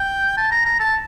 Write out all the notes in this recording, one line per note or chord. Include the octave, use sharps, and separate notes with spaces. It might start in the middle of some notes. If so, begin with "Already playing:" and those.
Already playing: G5
A5
A#5
A#5
A5